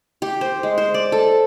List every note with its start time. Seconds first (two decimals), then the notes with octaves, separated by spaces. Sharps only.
0.22 G4
0.41 C5
0.63 G#3
0.78 C5
0.94 D5
1.12 A4